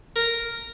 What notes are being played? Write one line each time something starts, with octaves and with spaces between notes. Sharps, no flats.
A#4